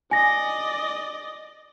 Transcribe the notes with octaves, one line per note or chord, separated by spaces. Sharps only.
D5 D#5 G#5 A#6